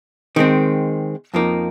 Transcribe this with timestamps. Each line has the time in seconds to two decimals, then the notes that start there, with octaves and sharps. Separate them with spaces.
0.36 D#3 G#3 C4
1.34 F2 F3 A#3 D#4